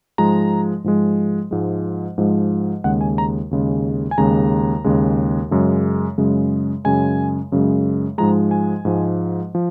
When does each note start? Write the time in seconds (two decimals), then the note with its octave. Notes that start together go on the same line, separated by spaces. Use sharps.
0.18 G#2 F3 G#3 A#5
0.84 G#2 F3 G#3
1.51 G#2 F3 G#3
2.18 G#2 F3 G#3
2.84 D#2 C#3 G#3 F#5
3.01 G#5
3.18 A#5
3.51 D#2 C#3 G#3
4.11 G#5
4.18 D#2 C#3 G#3 A#5
4.84 D#2 C#3 G#3
5.51 F#2 C#3 G#3
6.18 F#2 C#3 G#3
6.84 F#2 C#3 G#3 G#5
7.52 F#2 C#3 G#3
8.18 G#2 F3 G#3 A#5
8.51 G#5
8.85 G#2 F3 G#3
9.55 F3